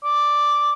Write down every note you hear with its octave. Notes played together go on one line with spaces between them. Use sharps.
D5